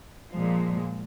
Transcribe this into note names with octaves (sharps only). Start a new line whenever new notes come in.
A#2 F3 G#3